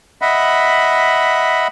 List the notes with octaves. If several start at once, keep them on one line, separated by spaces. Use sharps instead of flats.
D#5 E5 F#5 B5